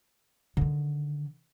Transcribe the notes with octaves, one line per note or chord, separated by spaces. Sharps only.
D3 D#3